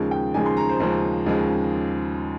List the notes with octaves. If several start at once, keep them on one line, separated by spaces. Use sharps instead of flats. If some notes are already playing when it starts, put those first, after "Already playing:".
Already playing: D#2 C#3 F3 G#3
G5
D#2 C#3 F3 G#3 G#5
C6
A#5
C5
D#2 C#3 F3 G#3 C5
D#2 C#3 F3 G#3